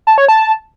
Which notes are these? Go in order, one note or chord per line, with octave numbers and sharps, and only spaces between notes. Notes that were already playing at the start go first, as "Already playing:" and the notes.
A5
C#5
A5